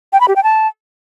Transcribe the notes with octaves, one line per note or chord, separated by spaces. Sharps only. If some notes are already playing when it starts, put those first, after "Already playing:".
G5
B5
G4
G5
A5